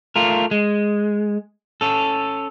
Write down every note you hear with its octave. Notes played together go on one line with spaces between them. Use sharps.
A3 F4 A#4
G#3
C#4 A4